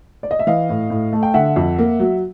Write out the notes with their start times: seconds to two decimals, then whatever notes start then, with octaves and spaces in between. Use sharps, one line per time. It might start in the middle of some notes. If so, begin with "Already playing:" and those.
0.23 D5
0.31 D#5
0.39 E5
0.47 E3 D#5 F5
0.69 A2
0.90 A2
1.13 A3
1.23 G5
1.34 D3 E5 F#5
1.56 F2
1.79 A#3
2.00 F#3